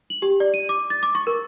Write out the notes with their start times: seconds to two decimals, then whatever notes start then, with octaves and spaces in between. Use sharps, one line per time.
0.10 F#7
0.22 G4
0.40 D5
0.54 D#7
0.69 D6
0.90 A6
1.03 D6
1.15 C#6
1.27 A#4